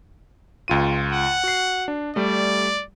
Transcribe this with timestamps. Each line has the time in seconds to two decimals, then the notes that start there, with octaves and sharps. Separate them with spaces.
0.68 C#2 F4 D#7
1.12 F#5
1.44 F#4 C7
1.88 D4
2.16 G3 A3 D5